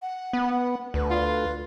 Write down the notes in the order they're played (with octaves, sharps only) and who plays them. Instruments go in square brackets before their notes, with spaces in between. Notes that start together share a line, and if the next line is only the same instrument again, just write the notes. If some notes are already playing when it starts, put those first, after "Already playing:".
[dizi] F#5
[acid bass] B3
[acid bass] D2 [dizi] B4
[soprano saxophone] F4